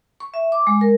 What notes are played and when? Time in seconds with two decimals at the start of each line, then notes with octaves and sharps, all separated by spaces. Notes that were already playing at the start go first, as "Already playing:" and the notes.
0.20 C#6
0.34 E5
0.52 D6
0.67 G#3
0.81 A#4